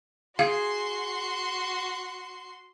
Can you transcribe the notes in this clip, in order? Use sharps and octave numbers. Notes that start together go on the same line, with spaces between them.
F#4 G#4 F5 C6